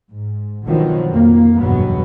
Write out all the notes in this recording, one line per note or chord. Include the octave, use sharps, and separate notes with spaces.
G#2
B2 D3 D#3 F3 F#3 B3
F2 A#3
F#1 E2 G2 B2 F#3 B3